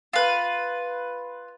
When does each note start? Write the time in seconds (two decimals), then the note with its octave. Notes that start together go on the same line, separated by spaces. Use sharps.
0.13 F4 B4